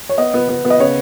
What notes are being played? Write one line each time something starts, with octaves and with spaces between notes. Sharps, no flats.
C#5
B3 D#5
B3
B3
B3
D#5
C#3 C#5